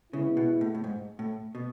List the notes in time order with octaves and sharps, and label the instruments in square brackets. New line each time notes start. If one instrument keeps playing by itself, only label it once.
[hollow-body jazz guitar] C#3 [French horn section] G#3 B3 E4
[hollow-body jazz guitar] B2
A2
A2
G#2
A2
B2